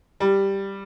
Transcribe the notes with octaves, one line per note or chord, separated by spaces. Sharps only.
G3